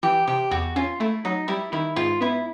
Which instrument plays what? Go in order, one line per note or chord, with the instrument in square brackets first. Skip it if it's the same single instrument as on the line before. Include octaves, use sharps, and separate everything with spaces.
[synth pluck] E3 [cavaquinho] G4
[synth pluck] C3 [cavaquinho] G4
[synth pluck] E2 [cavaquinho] F#4
[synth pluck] C#4 [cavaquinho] F4
[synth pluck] A3 [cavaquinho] E4
[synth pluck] F#3 [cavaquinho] D#4
[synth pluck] G3 [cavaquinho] E4
[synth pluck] D#3 [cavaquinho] E4
[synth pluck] G#2 [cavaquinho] F4
[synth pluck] B3 [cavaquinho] E4